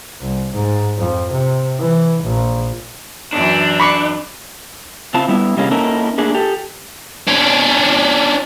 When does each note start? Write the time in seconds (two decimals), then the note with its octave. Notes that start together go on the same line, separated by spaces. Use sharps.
0.21 C2
0.54 G#2
0.97 F2
1.31 C3
1.80 E3
2.23 A#1
3.33 F#2 E3 D4
3.80 B5 C#6 D6
5.14 C#3 C4 E4 F4 A5
5.28 G3 B3 E4
5.57 C3 G3 G#3 A#3 C#4
5.71 A#3 C#4 D#4 E4 A4 A#4
6.18 A3 A#3 D4 G#4
6.34 G4 A4
7.27 C#4 D4